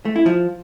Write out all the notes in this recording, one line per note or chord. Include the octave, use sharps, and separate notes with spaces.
A3
E4
F3